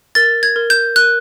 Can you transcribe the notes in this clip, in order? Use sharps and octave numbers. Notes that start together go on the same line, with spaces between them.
A#4 A6
G#6
A#4
G6
A#4 F#6